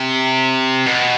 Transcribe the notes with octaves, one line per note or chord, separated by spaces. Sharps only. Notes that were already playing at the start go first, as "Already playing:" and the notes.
Already playing: C3
B2